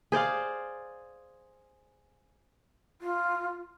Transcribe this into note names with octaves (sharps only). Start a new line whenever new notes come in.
G#4 C5 D5 F5
F4